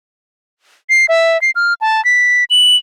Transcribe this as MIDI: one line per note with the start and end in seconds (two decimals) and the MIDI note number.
0.90 1.06 96
1.09 1.40 76
1.42 1.51 96
1.55 1.74 89
1.81 2.03 81
2.05 2.44 95
2.50 2.76 102